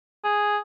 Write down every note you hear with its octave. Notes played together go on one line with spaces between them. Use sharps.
G#4